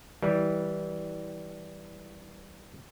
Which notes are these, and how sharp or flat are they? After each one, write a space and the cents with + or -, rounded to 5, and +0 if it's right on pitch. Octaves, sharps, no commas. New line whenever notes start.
E3 -20 G3 -10